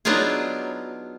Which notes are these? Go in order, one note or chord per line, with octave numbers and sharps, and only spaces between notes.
F#3 B3 D4 D#4 F4 G#4